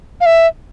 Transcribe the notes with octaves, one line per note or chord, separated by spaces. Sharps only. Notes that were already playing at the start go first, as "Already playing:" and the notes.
F5
E5